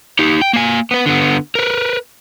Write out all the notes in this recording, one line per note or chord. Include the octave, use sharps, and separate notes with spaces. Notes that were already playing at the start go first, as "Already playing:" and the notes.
D#4 G4
G5
A#3 G#5
B3 B4
D3 B3
A#4 B4